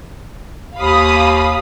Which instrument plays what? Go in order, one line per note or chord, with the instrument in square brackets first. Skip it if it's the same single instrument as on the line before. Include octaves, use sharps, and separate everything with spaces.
[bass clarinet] D#2 [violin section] F5 B5 D#6